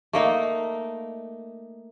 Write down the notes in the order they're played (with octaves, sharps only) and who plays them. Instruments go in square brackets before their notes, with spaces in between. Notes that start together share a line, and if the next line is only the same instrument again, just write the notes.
[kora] A3 A#3 D#4